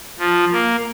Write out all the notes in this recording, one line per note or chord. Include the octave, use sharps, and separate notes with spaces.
F3
A#3